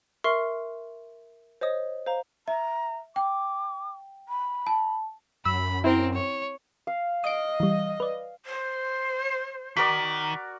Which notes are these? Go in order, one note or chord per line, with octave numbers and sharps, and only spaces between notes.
A#4 E5 C6 C#6 F6 C7
C5 C#5 D#5 D#6
C5 F5 A#5
E5 A#5
G5 D6
B5
A5
F#2 B5 E6
C4 E4 A#4 C5
C#5
F5
D#5 D#6 D7
E3 G3
B4 D5
C5
D#3 F#4 A#4 D5 B6